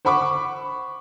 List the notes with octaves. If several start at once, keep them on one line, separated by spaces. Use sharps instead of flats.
C5 F#5 B5 C#6 D6